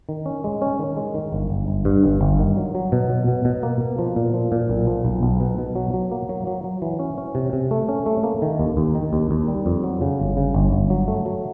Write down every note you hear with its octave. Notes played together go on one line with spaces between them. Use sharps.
D#3
C#4
G#3
C#4
D#3
G#3
D#3
G1
G1
G1
G2
G1
G1
D#3
F#3
F#3
B2
F#3
B2
B2
A#3
B2
F3
A#2
F3
A#2
B1
F3
B1
B1
B2
B2
F#3
F#3
A#3
F#3
F#3
F#3
E3
C#4
C#4
C3
C3
A3
C#4
A3
A#3
D#3
D#2
D#2
D#3
D#2
D#2
G3
F2
F#3
C#3
G1
C#3
G1
G1
F#3
A3
F#3